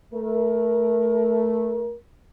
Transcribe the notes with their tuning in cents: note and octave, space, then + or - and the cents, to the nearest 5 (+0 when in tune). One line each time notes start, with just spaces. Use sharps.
A3 +0 A#4 +25